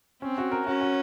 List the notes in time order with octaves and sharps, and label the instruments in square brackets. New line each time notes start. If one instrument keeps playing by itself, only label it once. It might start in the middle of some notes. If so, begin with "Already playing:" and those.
[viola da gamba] C4 [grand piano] C#4
[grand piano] F#4
A#4
[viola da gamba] C#4 [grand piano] F#4
[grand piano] F#4